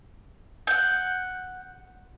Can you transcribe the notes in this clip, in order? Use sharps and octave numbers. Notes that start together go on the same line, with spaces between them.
F#5 G6